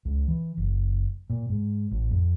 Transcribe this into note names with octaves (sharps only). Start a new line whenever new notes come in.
C#2
E3
F#1
A#2
G#2
A1
F2